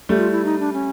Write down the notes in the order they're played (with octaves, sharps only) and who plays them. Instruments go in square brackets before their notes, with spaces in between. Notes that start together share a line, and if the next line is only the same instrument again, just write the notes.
[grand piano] G3 A3
[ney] F4
E4
D#4
D4
C#4